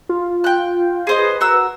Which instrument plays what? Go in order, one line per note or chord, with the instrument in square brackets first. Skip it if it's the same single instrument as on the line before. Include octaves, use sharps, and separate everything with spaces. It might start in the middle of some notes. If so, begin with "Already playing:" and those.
[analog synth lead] F4
[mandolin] G5 F#6
G#4 C5 D#5
[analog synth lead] B4
[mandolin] F#4 A#4 E6